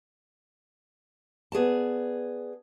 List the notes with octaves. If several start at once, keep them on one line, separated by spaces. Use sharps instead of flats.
B3 G#4 D5 A5